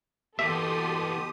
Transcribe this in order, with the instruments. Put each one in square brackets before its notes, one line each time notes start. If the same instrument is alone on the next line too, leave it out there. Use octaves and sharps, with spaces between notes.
[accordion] B2 G4 D#6 [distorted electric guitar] E3 A#3 [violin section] A4 C6 [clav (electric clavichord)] E5